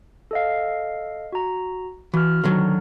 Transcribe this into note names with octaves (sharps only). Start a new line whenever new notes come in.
A4 D#5 F5
F#4 A#5
E3 F#4 F6
D3 D#3 F#3